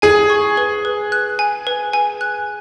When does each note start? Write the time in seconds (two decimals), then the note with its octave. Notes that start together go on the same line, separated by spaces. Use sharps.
0.02 G#4 G#5
0.30 C#6
0.57 B4
0.85 B4
1.12 F#6
1.39 G#5
1.67 B4
1.93 G#5
2.21 F#6